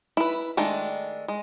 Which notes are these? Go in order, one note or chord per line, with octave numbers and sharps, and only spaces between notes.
E4 B4
D#3 G#3 A3 D4
G#3